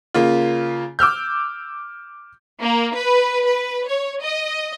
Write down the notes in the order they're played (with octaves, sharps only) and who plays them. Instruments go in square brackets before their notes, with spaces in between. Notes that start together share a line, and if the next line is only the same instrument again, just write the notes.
[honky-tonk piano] C#3 A#3 F4
D6 E6 F6 G6
[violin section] A#3
B4
B4
C#5
D#5